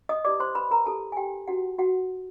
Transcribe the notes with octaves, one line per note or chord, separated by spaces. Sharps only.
D#5 D#6
E4 G4 B4 D5 D6
C5 C6
B4 B5
A#4 A#5
E4 G4 A4 B4 A5
G#5
G4 G5
E4 F#4 G4 B4 F#5
F#4 F#5